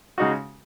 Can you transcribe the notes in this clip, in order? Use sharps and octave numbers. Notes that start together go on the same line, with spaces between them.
C#3 G#3 D#4 F#4